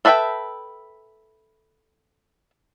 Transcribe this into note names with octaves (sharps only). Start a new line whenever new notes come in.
A4 B4 E5 F#5 G5